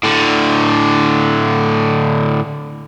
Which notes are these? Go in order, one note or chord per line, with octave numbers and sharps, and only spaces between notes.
A2 D3